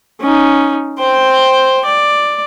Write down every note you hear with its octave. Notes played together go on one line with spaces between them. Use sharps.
C#4 D#4
C5 G5
D5